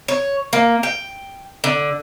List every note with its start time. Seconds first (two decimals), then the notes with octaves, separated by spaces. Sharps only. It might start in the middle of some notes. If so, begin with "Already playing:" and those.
0.08 C#5
0.53 A#3
0.83 G5
1.64 D3